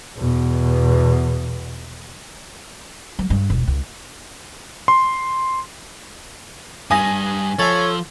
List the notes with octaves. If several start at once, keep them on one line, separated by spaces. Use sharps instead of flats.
E2 B2
F#3
G2
E1
C#2
C6
G2 G3 G#5 D#6 A#6
F3 A4 C#5 E5